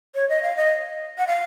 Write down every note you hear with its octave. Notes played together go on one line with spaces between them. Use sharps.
C#5
D#5
F5
D#5
F#5
F5